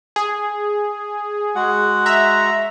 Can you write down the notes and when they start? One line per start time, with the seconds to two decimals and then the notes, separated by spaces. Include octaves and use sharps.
0.16 G#4
1.56 G#3 F#4 F#5
2.06 E5 A#5